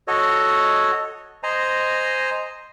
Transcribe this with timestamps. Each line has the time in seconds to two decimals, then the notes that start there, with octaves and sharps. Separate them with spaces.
0.08 F#4 A4 C#5 D#5
1.43 C5 D#5 G#5 A#5